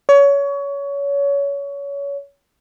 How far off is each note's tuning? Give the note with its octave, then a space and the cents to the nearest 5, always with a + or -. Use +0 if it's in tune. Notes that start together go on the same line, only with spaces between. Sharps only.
C#5 +25